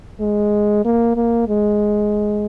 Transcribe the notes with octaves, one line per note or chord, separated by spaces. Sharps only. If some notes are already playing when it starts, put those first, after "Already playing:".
G#3
A#3
A#3
G#3